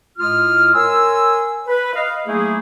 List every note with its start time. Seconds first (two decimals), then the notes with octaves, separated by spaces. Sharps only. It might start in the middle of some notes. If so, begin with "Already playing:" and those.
0.18 A2 G#3 F4 D#6 F6
0.74 A#4 C#5 G#5 C6 E6
1.67 B4
1.96 D#5 F5
2.27 F#3 A3 A#3 D#4 E4 G#4